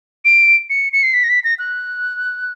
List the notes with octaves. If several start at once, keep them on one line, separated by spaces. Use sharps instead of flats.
D7
C#7
C#7
C7
B6
A#6
B6
A#6
F#6